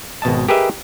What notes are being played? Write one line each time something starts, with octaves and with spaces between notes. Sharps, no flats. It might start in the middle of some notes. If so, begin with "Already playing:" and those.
G#1 B2 D#5 A5
G4 G#4 A#4 B4 D#5 E5